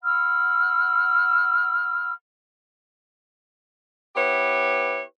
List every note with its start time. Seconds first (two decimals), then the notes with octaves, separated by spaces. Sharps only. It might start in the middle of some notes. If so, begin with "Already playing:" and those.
0.03 F#5 B5 E6 F6
4.16 B3 E4 G4 B4 C#5